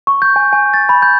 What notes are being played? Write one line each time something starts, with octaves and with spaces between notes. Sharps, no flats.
C#6
G6
G#5
G#5
A6
B5
G6